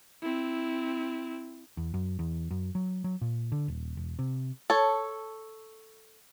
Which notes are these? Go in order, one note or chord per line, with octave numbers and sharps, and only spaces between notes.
C4 E4
E2
F#2
E2
F#2
F#3
F#3
A#2
D3
D#1
E1
C3
A4 C#5